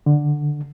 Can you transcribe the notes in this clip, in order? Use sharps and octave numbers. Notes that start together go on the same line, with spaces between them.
D3